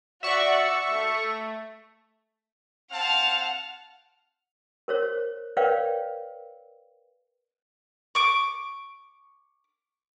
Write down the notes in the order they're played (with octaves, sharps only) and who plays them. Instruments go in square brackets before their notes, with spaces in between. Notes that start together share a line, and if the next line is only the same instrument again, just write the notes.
[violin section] F#4 D5 F#5 [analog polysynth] E5 C#6
[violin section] A3
[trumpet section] C4 F5 A5 [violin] F#5 F6
[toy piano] A#4 C5 C#5
A#4 B4 C#5 D5 F5 G5
[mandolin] C#6 D6